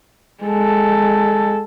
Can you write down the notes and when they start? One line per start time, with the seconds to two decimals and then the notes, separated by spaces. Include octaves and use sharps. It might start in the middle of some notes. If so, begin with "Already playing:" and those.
0.44 G#3 A4